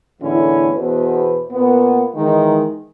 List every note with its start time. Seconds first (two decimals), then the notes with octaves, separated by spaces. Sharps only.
0.21 E2 A2 D3 C#4 E4
0.74 E2 B2 B4 C5
1.51 A#2 A#3 B3
2.15 D#3 E3 G#3 D#4